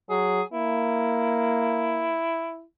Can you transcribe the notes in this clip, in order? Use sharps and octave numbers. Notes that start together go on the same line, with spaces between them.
F#3 G#4
A#3 E4